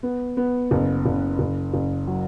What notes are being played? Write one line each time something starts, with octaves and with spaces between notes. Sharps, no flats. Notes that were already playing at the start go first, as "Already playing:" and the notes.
B3
B3
F#1
F#1
F#1
F#1
F#3